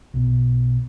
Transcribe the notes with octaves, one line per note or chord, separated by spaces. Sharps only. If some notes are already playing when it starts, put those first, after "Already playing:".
B1 B2